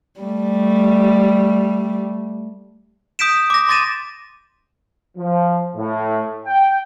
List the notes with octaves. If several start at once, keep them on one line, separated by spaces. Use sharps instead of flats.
G3 A3
D#6 G6 B6 D7 E7
D6 A#6
C6 D6 A6 A#6 D#7 E7
F3
A2
G5